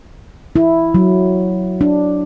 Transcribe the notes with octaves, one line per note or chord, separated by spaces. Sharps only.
E4
F#3
D4